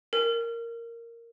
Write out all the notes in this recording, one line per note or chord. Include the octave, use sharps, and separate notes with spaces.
A#4